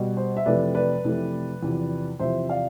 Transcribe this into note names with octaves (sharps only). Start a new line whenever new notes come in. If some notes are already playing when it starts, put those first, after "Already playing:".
Already playing: B2 G3
C5
E5
F2 C3 E3 A3 B4 D5
B4 D5
F2 C3 E3 A3
E2 C3 F3
E2 C3 F3 C5 E5
D5 F5